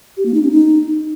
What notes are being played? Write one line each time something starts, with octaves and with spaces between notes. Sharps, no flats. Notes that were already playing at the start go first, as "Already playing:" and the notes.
G4
A#3
D#4
C#4
D#4